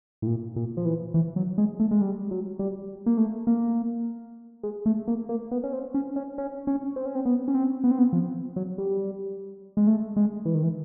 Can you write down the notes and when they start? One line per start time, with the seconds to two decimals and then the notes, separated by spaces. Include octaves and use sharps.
0.22 A2
0.27 A#2
0.56 A#2
0.77 F3
0.85 E3
1.14 E3
1.36 F#3
1.58 G#3
1.80 A3
1.91 G#3
2.02 G3
2.31 F#3
2.59 G3
3.06 A#3
3.18 A3
3.47 A#3
4.63 G#3
4.86 A3
5.08 A#3
5.29 A#3
5.51 B3
5.64 C#4
5.73 C4
5.94 C#4
6.16 C#4
6.38 C#4
6.67 C#4
6.96 C4
7.06 C#4
7.15 C4
7.25 B3
7.48 C#4
7.54 C4
7.84 B3
7.91 C4
7.99 B3
8.13 F3
8.56 F#3
8.78 G3
9.77 G#3
9.87 A3
10.17 G#3
10.45 E3
10.55 D#3
10.63 E3